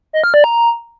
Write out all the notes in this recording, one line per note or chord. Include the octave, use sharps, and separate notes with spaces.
D#5
F6
D5
A#5